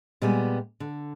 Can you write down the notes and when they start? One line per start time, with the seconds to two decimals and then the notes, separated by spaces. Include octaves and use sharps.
0.22 A#2 G3 G#3 B3 D5 G#5
0.80 D3